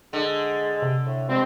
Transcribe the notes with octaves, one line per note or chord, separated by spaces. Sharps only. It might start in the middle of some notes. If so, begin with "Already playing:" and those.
D3 G#3
C3
A2
G2 F3 G#3 C4